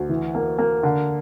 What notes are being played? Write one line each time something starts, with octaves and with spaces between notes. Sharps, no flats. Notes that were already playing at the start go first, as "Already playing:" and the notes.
Already playing: D2
E3
A#3
A#3
D3